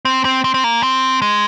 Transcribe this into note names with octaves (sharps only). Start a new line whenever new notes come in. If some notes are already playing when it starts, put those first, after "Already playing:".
C4
C4
C4
C4
A#3
C4
G#3